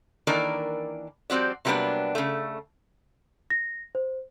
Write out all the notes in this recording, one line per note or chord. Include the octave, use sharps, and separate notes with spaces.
D#3 E3 A#3 D4 A#4 D5
F3 G3 C4 F#4 D5
C3 F#3 G3 A#3 B3 D4
C#3 A3
A#6
C5